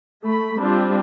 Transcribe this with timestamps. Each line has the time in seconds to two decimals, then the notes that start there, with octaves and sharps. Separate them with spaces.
0.25 A3 B5
0.59 G3 C4 D4 F4